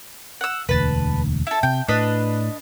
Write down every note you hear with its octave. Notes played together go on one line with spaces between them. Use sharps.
F#5 E6
E1 D2 B4 A5
E4 A4
C3 G5
A2 D4 B4 D#5